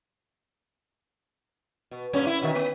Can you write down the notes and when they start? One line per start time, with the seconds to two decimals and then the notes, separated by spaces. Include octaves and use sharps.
1.91 B2
2.13 G2 A#2 C#4
2.27 E4
2.42 B2 D#3 E5
2.55 B3